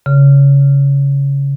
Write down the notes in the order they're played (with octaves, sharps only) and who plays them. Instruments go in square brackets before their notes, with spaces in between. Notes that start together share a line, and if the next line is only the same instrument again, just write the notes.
[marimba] C#3